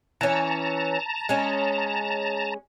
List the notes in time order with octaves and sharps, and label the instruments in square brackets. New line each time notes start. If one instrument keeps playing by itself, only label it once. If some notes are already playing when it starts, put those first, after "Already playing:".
[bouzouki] E3 C#4 [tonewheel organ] A5 A#5
[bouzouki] G#3 C#4